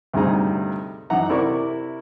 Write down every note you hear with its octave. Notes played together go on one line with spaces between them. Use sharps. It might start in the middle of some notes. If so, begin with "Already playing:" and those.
D2 G2 C3 D#4 G#4 A#5
F#2 E3 D#4 F#5 A#5
C3 E4 A#4 D5 C#6 D6